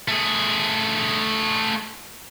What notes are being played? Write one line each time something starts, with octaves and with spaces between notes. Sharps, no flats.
A3 G#4